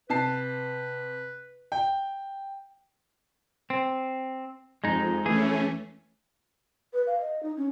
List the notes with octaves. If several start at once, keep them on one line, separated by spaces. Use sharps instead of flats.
C3 B4 A5 C7
G5
C4
F2 G#3 D#4
E3 A3 C#4 G#4
B4
F5
D#5
D#4
C#4